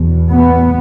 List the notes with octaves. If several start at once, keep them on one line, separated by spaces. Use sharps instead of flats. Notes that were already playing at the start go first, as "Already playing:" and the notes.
Already playing: E2 B2
B3